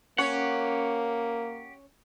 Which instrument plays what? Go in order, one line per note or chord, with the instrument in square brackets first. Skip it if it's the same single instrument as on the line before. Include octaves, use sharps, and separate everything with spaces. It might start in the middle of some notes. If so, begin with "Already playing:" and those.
[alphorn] A#3 [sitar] C#4 C#5 [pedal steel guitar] G4 F#5